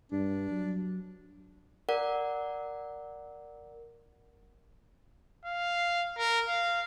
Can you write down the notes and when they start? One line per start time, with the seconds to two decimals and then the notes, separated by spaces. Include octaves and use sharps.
0.12 G2 D4
0.51 F#3
1.89 A#4 D5 F#5
5.45 F5
6.18 A#4
6.49 F5